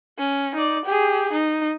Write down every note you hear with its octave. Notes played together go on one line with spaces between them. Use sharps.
C#4
D#4 D5
G4 G#4
D#4